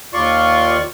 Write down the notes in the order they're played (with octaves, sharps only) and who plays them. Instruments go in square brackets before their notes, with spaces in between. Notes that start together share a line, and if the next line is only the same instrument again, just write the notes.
[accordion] D#2 F4 D5 C6 C#6